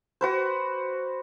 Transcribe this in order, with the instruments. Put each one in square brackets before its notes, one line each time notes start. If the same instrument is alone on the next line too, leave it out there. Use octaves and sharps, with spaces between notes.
[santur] F#4 B4 C5